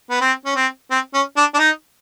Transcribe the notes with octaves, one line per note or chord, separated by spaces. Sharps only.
B3
C4
C#4
C4
C4
C#4
D4
D4
D#4